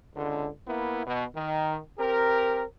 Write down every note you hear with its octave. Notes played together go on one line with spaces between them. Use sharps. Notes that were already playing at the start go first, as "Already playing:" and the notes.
C#2 D3
A#3 B3 E4
B2
D#3
C4 G4 A#4